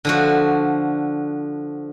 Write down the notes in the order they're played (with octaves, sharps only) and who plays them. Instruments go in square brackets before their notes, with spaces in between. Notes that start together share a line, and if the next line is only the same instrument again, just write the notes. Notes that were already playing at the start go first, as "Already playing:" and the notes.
[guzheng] D3 F3 F#4